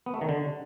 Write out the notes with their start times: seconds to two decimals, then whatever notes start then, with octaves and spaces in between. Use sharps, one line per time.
0.06 B3
0.14 A3
0.21 D#3
0.29 D3